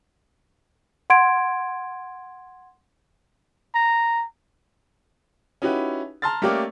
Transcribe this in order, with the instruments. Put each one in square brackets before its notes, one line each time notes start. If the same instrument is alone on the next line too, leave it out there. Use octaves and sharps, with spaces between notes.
[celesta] F#5 C6 G#6 D7
[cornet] A#5
[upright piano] C#4 D#4 E4 F#4 G4 B4
A5 A#5 C6 F6 A6
A3 A#3 C#4 G4 A#4 D5